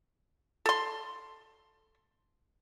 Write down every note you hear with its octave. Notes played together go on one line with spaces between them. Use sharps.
A4 C6